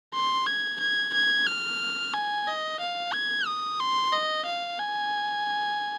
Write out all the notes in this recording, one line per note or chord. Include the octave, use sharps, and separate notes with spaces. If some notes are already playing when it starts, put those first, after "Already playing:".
C6
G#6
G#6
G#6
F6
G#5
D#5
F5
G#6
D#6
C6
D#5
F5
G#5